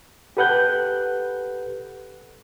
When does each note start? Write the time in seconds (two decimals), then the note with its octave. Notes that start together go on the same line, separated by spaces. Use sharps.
0.37 G4 A4 B4 F#5 F#6 G6